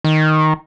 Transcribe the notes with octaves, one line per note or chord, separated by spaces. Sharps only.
D#3